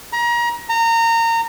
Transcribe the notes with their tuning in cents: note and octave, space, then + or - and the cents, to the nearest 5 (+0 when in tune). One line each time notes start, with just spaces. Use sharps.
A#5 +30
A#5 -25